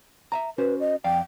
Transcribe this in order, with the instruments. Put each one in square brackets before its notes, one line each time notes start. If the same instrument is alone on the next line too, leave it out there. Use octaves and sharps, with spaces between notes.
[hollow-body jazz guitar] E5 F5 A#5
[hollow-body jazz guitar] C#4 F#4 C5 [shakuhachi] B4
[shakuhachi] D#5
[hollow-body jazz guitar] F2 D5 F5 [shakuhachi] G5